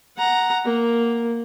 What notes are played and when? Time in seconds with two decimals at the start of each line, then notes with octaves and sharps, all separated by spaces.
0.17 F#5 A#5
0.65 A#3